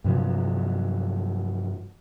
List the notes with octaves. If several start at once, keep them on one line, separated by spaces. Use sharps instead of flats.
G2 C3 F3 F#3